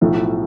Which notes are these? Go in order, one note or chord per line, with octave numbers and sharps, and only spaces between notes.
B1 A2 F3